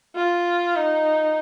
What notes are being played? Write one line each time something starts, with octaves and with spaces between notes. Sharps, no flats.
F4
D#4